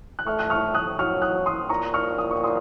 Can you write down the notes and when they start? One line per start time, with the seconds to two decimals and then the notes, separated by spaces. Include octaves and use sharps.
0.19 F#6
0.27 A3 C#6 F6
0.39 F#6
0.50 C#6 F6
0.74 D#6 F#6
0.99 F#3 C#6 F6
1.22 D#6 F#6
1.46 C6 D#6
1.69 A#2 A#5 C#6
1.94 C#6 F6
2.18 D#6
2.31 C#6
2.44 C6 D#6